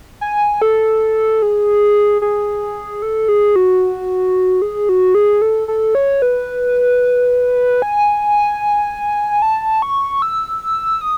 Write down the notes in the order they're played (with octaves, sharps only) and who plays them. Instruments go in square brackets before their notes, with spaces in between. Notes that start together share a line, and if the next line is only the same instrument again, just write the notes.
[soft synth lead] G#5
A4
G#4
G#4
A4
G#4
F#4
G#4
F#4
G#4
A4
A4
C#5
B4
G#5
A5
C#6
E6
D#6